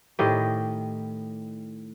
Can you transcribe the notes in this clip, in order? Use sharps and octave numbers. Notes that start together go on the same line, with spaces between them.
A2 D#3 G4 D#5